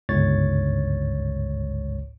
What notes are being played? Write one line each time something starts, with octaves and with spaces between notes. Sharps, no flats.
G1 C#2 G#2 C#5 A6